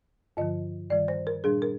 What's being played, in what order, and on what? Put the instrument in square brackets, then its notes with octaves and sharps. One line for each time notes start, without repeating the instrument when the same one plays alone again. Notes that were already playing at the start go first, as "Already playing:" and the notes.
[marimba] G2 D3 F3 D#5
G2 D#3 G3 D5
C5
A#4
A#2 G3 D4 G#4
A#4